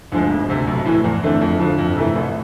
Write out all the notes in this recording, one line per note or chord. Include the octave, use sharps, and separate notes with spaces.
D2 D3 F3 G#3
E1
D2 C3
B1
A2 E3
E2
D3 A3 C4
F2
D3 F3
F2
C3 E3 A3
A1